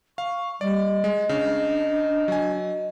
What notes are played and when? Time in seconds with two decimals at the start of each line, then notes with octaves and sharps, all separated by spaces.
0.18 F5 C#6
0.61 G3 D5 D#5
1.04 G#3
1.29 C#3 D4
2.28 F#3 G#5